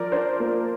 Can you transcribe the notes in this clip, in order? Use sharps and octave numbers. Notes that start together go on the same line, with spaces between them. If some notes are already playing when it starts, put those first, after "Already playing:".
Already playing: F3 A#4 D5
D4 C5
A#3